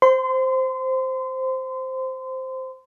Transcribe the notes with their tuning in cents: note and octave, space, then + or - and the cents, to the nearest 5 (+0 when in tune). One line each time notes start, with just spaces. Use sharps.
C5 +0 C6 -30